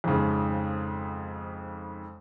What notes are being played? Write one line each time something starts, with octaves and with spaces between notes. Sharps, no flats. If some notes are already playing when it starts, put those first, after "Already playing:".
F2 G#2 C#3